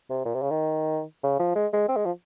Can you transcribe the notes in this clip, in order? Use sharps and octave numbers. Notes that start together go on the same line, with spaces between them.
C3
A#2
C3
C#3
D#3
C#3
F3
G#3
G#3
C4
G#3
F3